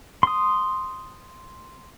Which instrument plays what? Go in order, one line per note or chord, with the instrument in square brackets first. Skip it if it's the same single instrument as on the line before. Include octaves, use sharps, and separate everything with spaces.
[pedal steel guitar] C6 D#6